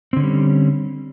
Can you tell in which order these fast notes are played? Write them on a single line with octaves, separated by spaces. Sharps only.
C4 D3 C#4 G3